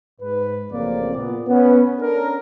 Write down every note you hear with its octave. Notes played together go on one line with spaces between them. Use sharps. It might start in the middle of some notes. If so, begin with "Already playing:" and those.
G#2 B4
A1 F2 C#3 A#3 C4 D5
A#2 B3
B3 C#4
C#4 D4 A4 A#4